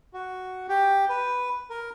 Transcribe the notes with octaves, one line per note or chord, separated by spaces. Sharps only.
F#4
G4
B4
A#4